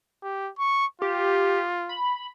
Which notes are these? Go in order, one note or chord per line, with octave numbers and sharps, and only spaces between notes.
G4
C#6
F4 G4
B5